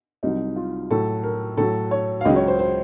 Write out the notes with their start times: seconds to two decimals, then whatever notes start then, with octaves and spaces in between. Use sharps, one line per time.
0.23 C2 C3 F#3 D#4
0.56 F4
0.91 A2 F#3 A4
1.23 A#4
1.57 A2 F#3 A4
1.91 C#5
2.21 F5
2.25 C#2 C#3 F#3 D#5
2.36 C#5
2.48 C5
2.59 C5